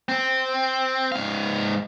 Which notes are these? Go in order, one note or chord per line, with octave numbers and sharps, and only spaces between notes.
C4
G#2 F5